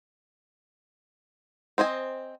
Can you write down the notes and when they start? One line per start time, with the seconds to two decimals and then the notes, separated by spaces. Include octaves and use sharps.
1.78 C4 C5 D#5 G#5